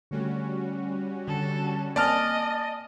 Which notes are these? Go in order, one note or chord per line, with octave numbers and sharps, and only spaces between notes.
D3 G3 A3 C#4 F#4
D3 A4
A#3 C4 D5 D#5 G#5 A5 F6